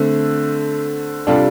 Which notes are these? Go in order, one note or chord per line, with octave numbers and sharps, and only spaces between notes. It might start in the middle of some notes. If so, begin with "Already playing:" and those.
Already playing: D3 A3 C4
C3 G3 D4 F4 A4